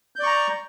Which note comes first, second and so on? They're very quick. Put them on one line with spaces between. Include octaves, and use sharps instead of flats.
G6 D5 C#6 A#5